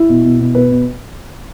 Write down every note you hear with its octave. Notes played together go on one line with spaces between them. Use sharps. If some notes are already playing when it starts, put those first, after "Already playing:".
Already playing: E4
B2
B2
B2
B2 B4
B2